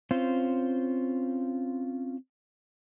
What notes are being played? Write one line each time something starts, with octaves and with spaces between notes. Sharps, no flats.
C4 C#4 F4 C5